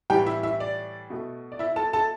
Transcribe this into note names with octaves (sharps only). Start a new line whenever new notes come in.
A2 E3 G3 G4 G5
E4 E5
E4 E5
D5
B2 A3
D5
E4 E5
A4 A5
A4 A5